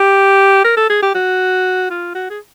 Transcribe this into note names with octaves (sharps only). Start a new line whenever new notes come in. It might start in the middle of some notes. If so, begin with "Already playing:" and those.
Already playing: G4
A#4
A4
G#4
G4
F#4
F4
F#4
G#4